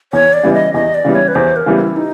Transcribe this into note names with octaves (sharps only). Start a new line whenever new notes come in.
E2 C#5
D5
C#3 E3 G3 B3
D#5
E2 D#5
D5
C#3 E3 G3 B3
C#5
B4
E2 C5
A#4
C#3 E3 G3 B3
E4
D#4